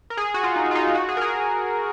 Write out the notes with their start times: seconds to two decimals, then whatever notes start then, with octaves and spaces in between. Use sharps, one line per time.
0.10 A#4
0.17 G#4
0.34 F#4
0.43 F4
0.56 D#4
0.71 F4
0.75 D#4
0.95 F#4
1.09 G#4
1.17 A#4
1.22 G#4